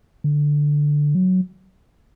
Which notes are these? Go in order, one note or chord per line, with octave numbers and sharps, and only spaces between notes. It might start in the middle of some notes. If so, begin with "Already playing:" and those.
D3
F#3